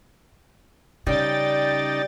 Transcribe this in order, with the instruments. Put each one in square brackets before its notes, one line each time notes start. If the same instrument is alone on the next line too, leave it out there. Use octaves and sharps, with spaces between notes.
[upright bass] C#3 [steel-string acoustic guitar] G3 [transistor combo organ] D#4 D5 [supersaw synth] G5 A6